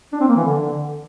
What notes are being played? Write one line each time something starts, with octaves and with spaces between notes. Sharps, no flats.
D4
C4
A#3
E3
D3